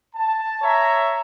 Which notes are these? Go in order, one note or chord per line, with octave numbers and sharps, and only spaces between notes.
A5
C#5 E5 A#5